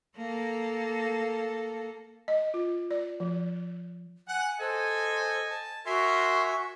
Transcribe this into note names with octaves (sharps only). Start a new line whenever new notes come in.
A#3 A4
D#5
F4
D5
F3
F#5 G#5
A4 C5 D#5 G#5
A5
F#4 A#4 E5 G#5 C6